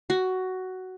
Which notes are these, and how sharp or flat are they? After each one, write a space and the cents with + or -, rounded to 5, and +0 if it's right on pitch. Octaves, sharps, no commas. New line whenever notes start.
F#4 +10